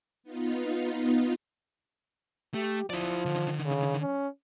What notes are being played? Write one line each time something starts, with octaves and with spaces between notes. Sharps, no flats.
B3 D#4 F4
A3 G4
F3 E4 D5
D3 D#3
C#3
C#4